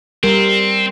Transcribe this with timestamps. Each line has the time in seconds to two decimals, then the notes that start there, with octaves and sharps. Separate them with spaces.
0.24 G3 C4 A#4